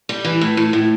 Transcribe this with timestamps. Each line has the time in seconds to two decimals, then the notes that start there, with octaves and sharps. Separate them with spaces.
0.09 G3
0.24 E3
0.41 A2
0.57 A2
0.73 A2